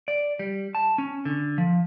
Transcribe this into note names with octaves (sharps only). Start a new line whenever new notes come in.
D5
G3
A5
C#4
D3
F3